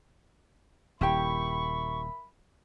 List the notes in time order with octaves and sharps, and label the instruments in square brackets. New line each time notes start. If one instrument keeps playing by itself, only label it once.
[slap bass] D#1 [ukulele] E4 G4 G5 [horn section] A#4 E5 B5 [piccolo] C#6